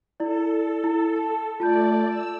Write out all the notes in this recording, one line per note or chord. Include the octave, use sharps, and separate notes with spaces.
E4 A4 D5
E4
A5
A3 F4 D5 A5 G6
E6